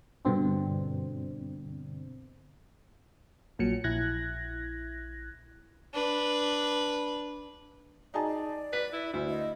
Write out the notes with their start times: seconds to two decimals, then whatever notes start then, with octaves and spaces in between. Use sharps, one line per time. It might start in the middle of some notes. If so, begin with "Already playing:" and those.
0.25 G2 B2 D3 C4 D4
3.59 A#1 A#2 F#3 C#7
3.84 A#1 E4 F#6 G#6 A#6
5.94 D4 B4
8.14 D#4 G#4 D5 A5
8.73 B4 B6
8.93 E4
9.13 D2 E4
9.29 D#5